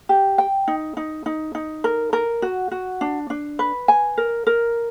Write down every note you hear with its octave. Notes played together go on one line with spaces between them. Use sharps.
G4
G5
D#4
D#4
D#4
D#4
A#4
A#4
F#4
F#4
D4
D4
B4
G#5
A#4
A#4